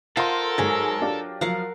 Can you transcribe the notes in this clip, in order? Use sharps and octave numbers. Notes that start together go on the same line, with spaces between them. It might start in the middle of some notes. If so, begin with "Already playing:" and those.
F4 A4 A#4 C5 D#5 F#5 C6
G#2 F#3 G#4 C#5 A#6
D4 F4 G4
F3 F#3 A#4 F5 F#5